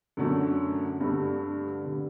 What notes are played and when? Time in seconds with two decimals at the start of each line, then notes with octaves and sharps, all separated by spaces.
0.17 F#2 D3 F#3 A3
1.01 G2 D3 A3
1.84 D3 G3